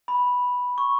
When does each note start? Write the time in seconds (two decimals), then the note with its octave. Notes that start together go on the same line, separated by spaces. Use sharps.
0.08 B5
0.78 C#6